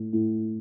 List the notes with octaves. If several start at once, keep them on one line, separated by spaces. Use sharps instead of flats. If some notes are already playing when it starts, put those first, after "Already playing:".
Already playing: A2
A2